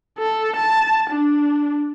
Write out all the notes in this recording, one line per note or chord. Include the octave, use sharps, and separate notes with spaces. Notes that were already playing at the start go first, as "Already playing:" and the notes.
A4
A5
D4